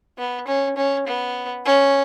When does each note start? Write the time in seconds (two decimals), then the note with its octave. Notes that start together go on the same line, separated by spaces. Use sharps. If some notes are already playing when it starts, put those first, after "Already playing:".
0.18 B3
0.47 C#4
0.76 C#4
1.07 B3
1.65 C#4